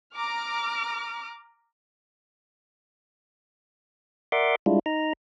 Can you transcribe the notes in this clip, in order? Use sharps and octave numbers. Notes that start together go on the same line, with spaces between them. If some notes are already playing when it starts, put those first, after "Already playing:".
A#5 D6 F6
A#4 D5 E5 F#5 C6 D6
G3 G#3 D4 E4 F4
D#4 A#5